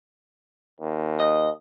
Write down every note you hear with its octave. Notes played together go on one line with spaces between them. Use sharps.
D#2
D#5